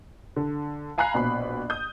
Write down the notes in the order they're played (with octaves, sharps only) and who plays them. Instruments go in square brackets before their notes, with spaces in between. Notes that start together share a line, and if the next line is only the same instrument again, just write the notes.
[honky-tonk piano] D3
F5 G#5 A#5 B5 F#6 C7
A#1 B2 B5
D#6 G6